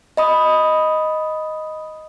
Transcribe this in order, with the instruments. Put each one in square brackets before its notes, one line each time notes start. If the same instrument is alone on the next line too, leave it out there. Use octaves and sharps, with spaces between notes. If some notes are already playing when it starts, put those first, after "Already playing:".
[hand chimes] D#5 B5 D#6